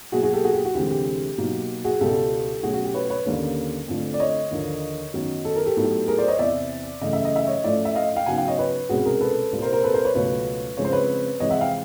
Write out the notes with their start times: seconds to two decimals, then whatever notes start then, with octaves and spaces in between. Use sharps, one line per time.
0.12 B2 F#3 A#3 F#4 G#4
0.23 F#4 G#4
0.34 G4 A4
0.44 F#4 G#4
0.54 G4
0.65 F#4
0.75 D2 C3 E3 G#3 G4
0.91 G4
1.38 B2 F#3 A#3 D#4
1.84 F#4 G#4
2.00 C#2 B2 G3 G4 A4
2.63 B2 F#3 A3 C#4 F#4 G#4
2.74 F#4
2.85 G4
2.94 B4 C#5
3.10 B4 C#5
3.25 D#2 D3 G3 A#3 C#4
3.88 F2 D3 F3 A3
4.14 D5
4.20 C#5 D#5
4.51 D#2 D3 F3
5.14 F#2 D#3 F#3 B3
5.45 A4
5.56 A#4
5.66 G4 A4
5.77 A2 F#3 B3 D#4
6.08 G#4 A#4
6.18 C5 D5
6.28 C#5 D#5
6.39 E2 C3 E3 D5 E5
7.01 F#2 C#3 E3 A3 D#5
7.13 E5
7.25 D#5
7.36 E5
7.47 C#5 D#5
7.64 A2 F3 A3 C#4 D5 E5
7.85 E5
7.95 D#5 F5
8.16 F5 G5
8.26 C#3 F#3 B3 D#4 F#5 G#5
8.38 F5 G5
8.48 C#5 D#5
8.58 B4 C#5
8.89 C2 B2 G#3 C#4 F#4 G#4
9.05 G#4 A#4
9.21 A4 B4
9.52 C2 A#2 G3 C4
9.62 A#4 C5
9.73 A#4 C5
9.83 A4 B4
9.94 A#4 C5
10.05 B4 C#5
10.15 C#2 B2 F#3 A3 B4 C#5
10.77 F2 C#3 F3 G#3 C4 C#5
10.85 C5
10.92 B4 C#5
11.40 F2 C3 E3 G#3 C#5 D#5
11.50 E5 F#5
11.61 F5 G5